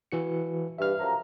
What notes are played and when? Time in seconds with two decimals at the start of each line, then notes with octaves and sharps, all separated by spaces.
0.12 E3 F#4 C#7
0.78 G2 E5 F6
1.00 F#2 F3 A#5